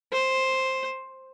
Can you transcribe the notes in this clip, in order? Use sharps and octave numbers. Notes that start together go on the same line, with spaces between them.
C5